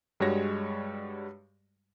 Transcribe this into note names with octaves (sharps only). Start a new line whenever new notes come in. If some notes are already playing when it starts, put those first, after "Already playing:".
G2 G3 G#3 F#4 C#5 A#6